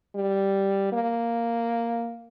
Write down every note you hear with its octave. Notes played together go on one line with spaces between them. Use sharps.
G3
A#3